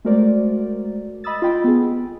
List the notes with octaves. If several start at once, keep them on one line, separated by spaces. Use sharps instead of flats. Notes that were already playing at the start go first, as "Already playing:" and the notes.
G#3 A3 F#4 A#4 C5 D5
D#5 B5 D#6 E6 A6
F4 D#5 G5 B5
B3 G#4